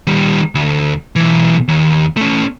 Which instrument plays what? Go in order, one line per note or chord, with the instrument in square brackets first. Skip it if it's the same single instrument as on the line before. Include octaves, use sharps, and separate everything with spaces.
[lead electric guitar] D#3 G3
D2
B1 E3
D#2
A3 C#4